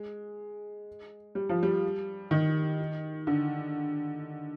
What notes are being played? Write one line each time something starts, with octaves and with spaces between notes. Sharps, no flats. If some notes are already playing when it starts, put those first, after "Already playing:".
Already playing: G#3
G3
F3
G3
D#3
D3